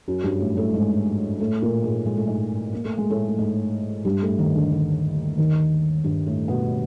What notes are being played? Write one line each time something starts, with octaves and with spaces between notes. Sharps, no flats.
F#2 F#3
G2 G3
A2 A3
A2 A3
G#2 G#3
A2 A3
A#2 A#3
G#2 G#3
G#3
A3
G#2 G#3
A#3
A3
G#3
A2 A3
A3
G#2 G#3
G2 G3
A2 A3
D#2 D#3
D3
D3
D#2 D#3
G2 G3
A2 A3
B2 B3